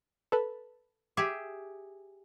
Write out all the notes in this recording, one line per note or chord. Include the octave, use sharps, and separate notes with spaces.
A4 B4
G4 G#4 E5